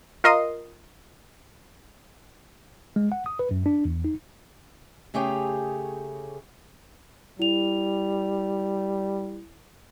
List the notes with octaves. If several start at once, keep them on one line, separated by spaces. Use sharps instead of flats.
F4 A#4 D#5 C6 D#6
G#3
F#5
D#6
B4
F#2
D4
E2
D#4
C#3 A3 G4 G#4 C#5 G5
G3 E4 F7